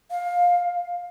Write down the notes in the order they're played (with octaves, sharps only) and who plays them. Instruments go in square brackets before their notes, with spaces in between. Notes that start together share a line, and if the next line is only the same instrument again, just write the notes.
[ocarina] F5